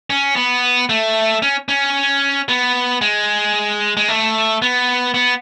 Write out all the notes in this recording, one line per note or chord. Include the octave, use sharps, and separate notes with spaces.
C#4
B3
A3
C#4
C#4
B3
G#3
G#3
A3
B3
B3